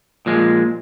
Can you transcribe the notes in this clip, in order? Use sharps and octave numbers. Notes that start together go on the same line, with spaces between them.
A#2 F3 G#3